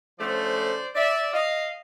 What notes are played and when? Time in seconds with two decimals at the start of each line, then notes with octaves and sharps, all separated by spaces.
0.19 D3 F3 A3 C#4 C5 D5
0.95 D5 E5
1.33 D#5 F5